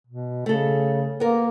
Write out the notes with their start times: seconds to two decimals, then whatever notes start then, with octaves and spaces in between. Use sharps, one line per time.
0.07 B2
0.46 C#3 A3 A4
1.20 A#3 B3 A#4